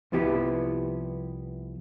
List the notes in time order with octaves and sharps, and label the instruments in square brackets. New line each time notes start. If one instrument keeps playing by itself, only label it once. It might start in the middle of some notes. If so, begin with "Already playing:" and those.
[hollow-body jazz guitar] C2 F3 B3 E4 G4